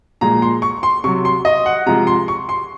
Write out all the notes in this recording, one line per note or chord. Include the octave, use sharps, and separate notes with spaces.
A#2 F3 G#3 A#5
C6
C#6
C6
C3 F#3 C#6
C6
D#5
F#5
C3 F3 G#3 A#5
C6
C#6
C6